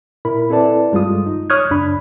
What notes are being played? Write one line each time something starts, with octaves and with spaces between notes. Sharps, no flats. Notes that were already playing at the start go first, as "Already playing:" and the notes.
A#2 E4 A#4 B5
C4 E4 A4 B4 D5 A5
G2 G3 G#3 F4 D#6
D#4
C#5 C#6 D#6 F6 F#6 G#6
C#2 F#2 D4 B5